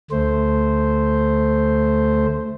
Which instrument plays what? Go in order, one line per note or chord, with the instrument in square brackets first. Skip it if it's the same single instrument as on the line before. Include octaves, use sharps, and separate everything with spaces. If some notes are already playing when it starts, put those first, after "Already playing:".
[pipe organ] D2 A3 C5